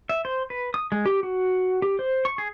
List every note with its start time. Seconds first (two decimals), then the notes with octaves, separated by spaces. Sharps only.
0.09 E5
0.25 C5
0.50 B4
0.74 D#6
0.92 G#3
1.06 G4
1.23 F#4
1.82 G4
1.99 C5
2.25 C#6
2.38 G#4